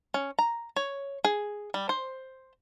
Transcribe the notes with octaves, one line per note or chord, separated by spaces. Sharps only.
C#4
A#5
C#5
G#4
G3
C5